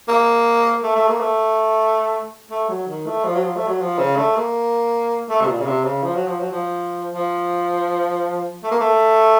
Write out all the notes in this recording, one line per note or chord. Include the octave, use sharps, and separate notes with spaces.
A#3
A3
A3
A#3
A3
A3
F#3
D#3
A3
F3
F#3
F3
A3
F#3
F3
C#3
A3
A#3
A3
C3
A#2
C#3
C3
C#3
F3
F#3
F3
F#3
F3
F3
A3
A#3
A3